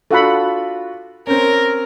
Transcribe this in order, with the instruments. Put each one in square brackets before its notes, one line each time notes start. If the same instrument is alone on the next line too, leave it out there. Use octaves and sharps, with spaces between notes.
[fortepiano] D4 F4 F#4 [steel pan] A4 F#5 B5
[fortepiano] C4 C#4 [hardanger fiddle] A#4